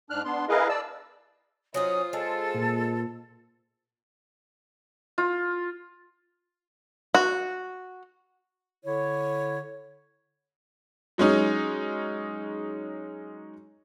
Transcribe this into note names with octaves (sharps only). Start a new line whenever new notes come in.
G#2 D4 F6 F#6
B3 D4 C6
E4 G#4 A#4 B4 D#5 F5
D5 A5 E6
F#3 C#4 D#4 F4 C5 D#6
G#3 A4
A#2
F4
F#4
D3 E4 C#5
F#3 G#3 C#4 D#4